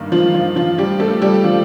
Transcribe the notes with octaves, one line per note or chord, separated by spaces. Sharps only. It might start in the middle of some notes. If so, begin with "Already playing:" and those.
Already playing: G2 D#3 A#3
F3 F4
F3 F4
F3 F4
G3 G4
A3 A4
G3 G4
F3 F4